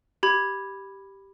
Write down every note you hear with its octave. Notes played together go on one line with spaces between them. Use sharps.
G4 B5 G#6